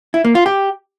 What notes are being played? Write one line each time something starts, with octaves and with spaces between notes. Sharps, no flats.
E4
A#3
F4
G4